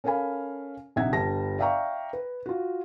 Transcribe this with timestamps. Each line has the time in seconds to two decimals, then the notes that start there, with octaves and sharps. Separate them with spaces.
0.04 C#4 A4 A#4 F5 G#5 B5
0.96 A#1 C3 D#4 E5 F#5 G#6
1.12 G1 G3 A5 A#6
1.59 D5 E5 F5 G5 A#5 C#6
2.13 B4
2.46 F4 F#4